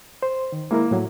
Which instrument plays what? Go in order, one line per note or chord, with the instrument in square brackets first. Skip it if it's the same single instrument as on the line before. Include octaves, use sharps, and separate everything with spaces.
[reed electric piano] C5
D#3
[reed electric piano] G#3 E4 A#4 [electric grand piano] A#3
[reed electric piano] A2 F#3